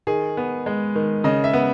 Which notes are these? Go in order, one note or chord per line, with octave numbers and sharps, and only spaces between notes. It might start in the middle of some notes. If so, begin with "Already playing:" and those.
D#3 G#4
B3
G#3
D#3
C#3 D#5
E5
B3